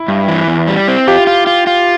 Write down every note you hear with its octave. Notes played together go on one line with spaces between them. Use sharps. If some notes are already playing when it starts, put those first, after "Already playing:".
Already playing: E4
G2
E3
E2
G3
C4
F4 G4
F4
F4
F4